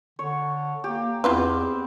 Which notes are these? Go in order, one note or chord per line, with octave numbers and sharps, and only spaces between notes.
D3 C#5
A#3 G4
E2 B3 C4 E4 F4 B4